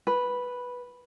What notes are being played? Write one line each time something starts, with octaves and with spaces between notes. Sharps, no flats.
B4